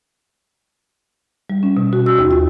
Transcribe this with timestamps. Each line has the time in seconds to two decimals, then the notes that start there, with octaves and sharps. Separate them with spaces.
1.50 G3
1.63 C#4
1.77 B2
1.93 F#4
2.06 E6
2.19 D#2
2.31 F4